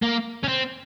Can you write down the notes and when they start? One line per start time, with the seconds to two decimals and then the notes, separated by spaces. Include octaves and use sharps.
0.02 A#3
0.44 C#4
0.48 C4